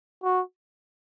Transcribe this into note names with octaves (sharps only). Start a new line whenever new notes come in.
F#4